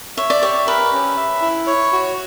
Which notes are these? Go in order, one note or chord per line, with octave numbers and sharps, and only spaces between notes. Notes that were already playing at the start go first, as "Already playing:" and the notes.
C#5 E5
D5
G4 C#5
A#4 B4
C#4
E5
E4
C#5
F#4